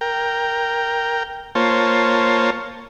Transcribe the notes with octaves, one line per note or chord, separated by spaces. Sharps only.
A#4 G5
A#3 F4 C5 C#5 A5